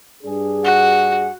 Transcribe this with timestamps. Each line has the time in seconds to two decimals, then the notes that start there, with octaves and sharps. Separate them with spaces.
0.24 G2 D4 G#4
0.64 F#4 F#5